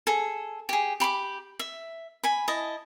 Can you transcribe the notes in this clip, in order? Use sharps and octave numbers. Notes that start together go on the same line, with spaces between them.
G#4 A4
G4 G#4
G4 B5 C6 D6
E5
G#5 B5
E4 D#5 A5